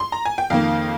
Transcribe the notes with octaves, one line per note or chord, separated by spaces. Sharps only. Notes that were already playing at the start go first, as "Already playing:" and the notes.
C6
A#5
G#5
G5
F2 D#3 A#3 F5